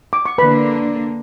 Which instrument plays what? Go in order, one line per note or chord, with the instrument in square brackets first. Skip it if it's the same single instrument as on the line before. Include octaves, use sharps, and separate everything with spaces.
[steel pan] D6
C#6
[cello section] D3 A#3 D4 [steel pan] B4 B5